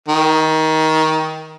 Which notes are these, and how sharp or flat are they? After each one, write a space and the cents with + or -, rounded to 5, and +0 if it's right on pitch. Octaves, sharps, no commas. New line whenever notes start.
D#3 +20